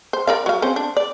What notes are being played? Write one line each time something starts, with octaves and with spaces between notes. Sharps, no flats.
C5
A#4 D5 F5
F#3 F5
C4 C#4 C5
D4
D5